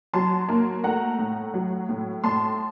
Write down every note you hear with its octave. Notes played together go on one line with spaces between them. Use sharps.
F#3 A5 C6
A#3
A3 F#5 A#5
A2
F#3
A2
A2 A5 C6